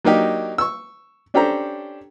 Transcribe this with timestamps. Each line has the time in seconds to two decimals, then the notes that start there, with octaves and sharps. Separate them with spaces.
0.05 F#3 A#3 D4 D#4 G4
0.58 C#6 E6
1.34 C#4 D4 G4 A4 C5 A#5